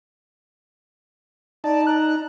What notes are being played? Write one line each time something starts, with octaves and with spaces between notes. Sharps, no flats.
D#4 D5 A5
A#5 F#6